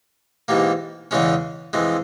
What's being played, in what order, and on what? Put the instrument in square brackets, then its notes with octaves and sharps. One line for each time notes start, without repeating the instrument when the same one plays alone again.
[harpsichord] G#2 E3 G3 A#3
E2 C#3 E3 G#3 C#4
F2 E3 G#3